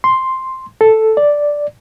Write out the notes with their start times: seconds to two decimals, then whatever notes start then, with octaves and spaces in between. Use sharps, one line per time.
0.04 C6
0.81 A4
1.17 D5